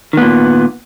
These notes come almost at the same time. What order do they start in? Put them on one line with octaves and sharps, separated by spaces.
D#3 B3 A#2